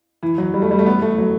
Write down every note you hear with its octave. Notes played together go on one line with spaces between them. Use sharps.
E3
F#3
G3
A3
G3
A3
B3
A3
F#3